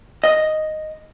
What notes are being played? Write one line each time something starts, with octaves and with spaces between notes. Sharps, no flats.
D#5